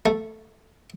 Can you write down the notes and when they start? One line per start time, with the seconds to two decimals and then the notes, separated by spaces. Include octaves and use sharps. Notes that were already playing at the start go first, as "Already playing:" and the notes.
0.06 A3